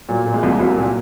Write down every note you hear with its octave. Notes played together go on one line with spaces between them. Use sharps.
A#2 F#3
A#2
G#3
C2
C2 F#3 A#3
A#2